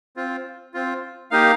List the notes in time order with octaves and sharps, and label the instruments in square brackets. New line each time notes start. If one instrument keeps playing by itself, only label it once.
[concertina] C4 F4
C4 F4
A#3 D#4 G4 F5